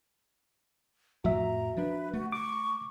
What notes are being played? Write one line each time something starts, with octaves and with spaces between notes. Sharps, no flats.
F2 A2 F3 F#4 E5 A#5
F3 D4 B4
A3 F#4
C#6 D6